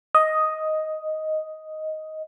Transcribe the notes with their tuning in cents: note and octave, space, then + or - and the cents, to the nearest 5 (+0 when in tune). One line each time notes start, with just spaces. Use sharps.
D#5 +5